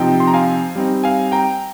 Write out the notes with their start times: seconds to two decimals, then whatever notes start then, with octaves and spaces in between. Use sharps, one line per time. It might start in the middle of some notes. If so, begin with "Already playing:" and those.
Already playing: C3 F3 C4 D#4 G5
0.20 C6
0.27 A#5
0.34 F5 G#5
0.76 G3 C4 D#4
1.04 F5 G#5
1.32 G5 A#5